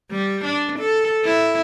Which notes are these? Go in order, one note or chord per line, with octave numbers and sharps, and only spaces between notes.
G3
D4
A4
E4